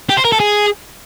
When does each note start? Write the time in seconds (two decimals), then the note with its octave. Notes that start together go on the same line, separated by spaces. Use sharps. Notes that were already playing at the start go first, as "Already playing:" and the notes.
0.09 G4
0.17 C5
0.25 A#4
0.32 A4
0.40 G#4